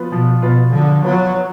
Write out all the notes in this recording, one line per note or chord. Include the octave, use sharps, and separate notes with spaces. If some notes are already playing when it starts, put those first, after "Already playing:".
Already playing: F3 B3 F4 B4
B2 F3
B2 B3 F4 B4
D3 F3
F#3 B3 F4 B4
F#3